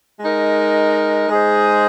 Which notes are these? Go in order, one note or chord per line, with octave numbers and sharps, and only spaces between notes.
G#3 D#4 A#4
G#3 D#4 G#4 C5